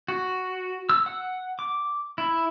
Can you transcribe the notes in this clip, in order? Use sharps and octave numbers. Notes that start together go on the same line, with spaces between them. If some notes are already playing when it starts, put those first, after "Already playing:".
F#4
E6
F#5
D6
E4